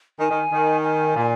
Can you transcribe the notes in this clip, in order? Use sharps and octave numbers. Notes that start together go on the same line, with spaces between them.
D#3 G#5
D#3
D#3
G#5
A#2